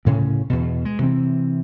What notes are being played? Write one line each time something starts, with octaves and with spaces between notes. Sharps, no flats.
D2 A2 C#3 C#4
E2 B2
G#3
C3 E3 C4